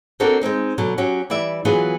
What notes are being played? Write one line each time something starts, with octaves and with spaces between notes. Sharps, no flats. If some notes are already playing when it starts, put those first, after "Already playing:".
A#3 C4 D4 F#4 A4 A#4
G#3 A3 C4 D#4
B2 D3 F#3
F#3 C#4 F#4 G4
E3 G3 D5 E5
E3 F#3 B3 F4 G#4